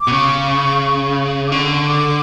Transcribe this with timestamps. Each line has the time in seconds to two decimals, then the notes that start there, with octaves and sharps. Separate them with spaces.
0.01 D6
0.08 B2
0.12 C#3 C#6
1.47 D6
1.52 D3 C#6
1.87 D6